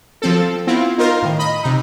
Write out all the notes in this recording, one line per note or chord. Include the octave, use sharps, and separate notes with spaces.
F3 C4 A4
B3 C4 E4 F4
D#4 F4 A#4 C5
A2 D#3
D#5 B5
C3 D#4